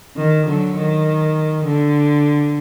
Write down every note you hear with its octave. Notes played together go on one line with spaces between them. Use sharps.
D#3
D3 F#3
D#3
D3